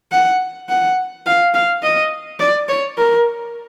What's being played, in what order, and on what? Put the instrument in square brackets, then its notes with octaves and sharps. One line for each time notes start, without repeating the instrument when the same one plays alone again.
[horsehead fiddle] F#5
F#5
F5
F5
D#5
D5
C#5
A#4